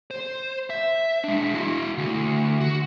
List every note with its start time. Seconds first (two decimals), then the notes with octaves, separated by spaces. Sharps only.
0.11 C5
0.70 E5
1.24 G#3 D4
1.54 E4 F#4
1.98 D2
2.61 F#4